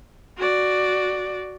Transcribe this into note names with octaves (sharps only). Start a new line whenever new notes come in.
F#4 D5